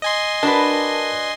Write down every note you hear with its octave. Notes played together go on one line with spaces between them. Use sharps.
D#5 G#5 C6
D4 F#4 A#4 B4 A5